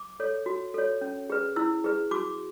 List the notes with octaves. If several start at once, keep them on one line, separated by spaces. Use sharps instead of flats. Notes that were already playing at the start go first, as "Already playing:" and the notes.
Already playing: D6
A4 C#5
F#4
A4 C#5
C#4
G#4 B4
E4 E6
G#4 B4
F#4 D6